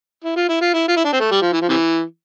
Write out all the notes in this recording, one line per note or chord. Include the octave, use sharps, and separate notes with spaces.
E4
F4
E4
F4
E4
F4
E4
D4
C4
A3
G3
F3
E3
F3
C3 E3